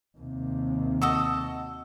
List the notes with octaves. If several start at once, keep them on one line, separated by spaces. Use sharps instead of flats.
D#2 C3
F#4 A4 D#5 E6